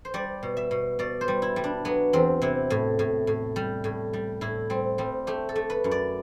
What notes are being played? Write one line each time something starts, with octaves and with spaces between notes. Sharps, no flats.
C5
G3 D5
B2
E5
B2
B2 D5
C5
G3
E4
G3
D4
F#3 B3
E2 C4
C3 E4
A2
A2
A2
G3
A2
G3
A2 E4
G3 C4
G3 C4
A3 G4
A4
A3
B4
F#2
D5